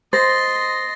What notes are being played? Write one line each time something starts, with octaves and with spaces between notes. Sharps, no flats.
C5 D#5 C6 A6 A#6